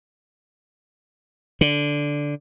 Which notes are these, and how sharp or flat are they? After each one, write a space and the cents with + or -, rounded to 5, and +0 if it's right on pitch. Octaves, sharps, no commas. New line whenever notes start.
D3 -5